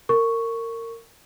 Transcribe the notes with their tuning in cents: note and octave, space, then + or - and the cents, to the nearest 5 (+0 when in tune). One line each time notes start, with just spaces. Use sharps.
A#4 -25 C#6 +0